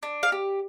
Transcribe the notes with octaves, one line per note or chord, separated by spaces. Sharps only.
D4
F5
G4